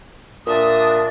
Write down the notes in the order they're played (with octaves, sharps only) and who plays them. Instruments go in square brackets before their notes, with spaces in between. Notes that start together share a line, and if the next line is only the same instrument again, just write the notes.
[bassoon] A#2 [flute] D4 [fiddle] E5 [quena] D#6